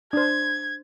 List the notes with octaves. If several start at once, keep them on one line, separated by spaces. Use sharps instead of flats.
D4 C5 G#6